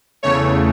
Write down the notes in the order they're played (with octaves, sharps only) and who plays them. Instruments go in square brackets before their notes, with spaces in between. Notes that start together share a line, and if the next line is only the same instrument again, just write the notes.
[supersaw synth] E2 C#3 A3 C#5